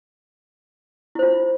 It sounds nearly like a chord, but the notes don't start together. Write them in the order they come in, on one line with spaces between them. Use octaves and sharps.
E4 C5 F4